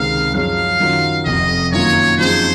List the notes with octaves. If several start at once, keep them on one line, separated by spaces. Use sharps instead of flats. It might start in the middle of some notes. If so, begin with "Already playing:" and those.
Already playing: C#2 C3 D#3 G#3 C4 F5
F#2 F3 G#3 C#4 F5
F#2 D#3 F#3 C#4 F4
F1 F2 C3 D#5
F#2 D#3 A#3 F4 C#5
F#2 F3 C4 D#4 G#4 C5